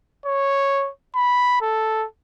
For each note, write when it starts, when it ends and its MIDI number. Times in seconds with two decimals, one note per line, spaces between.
0.26 0.89 73
1.15 1.57 83
1.61 2.05 69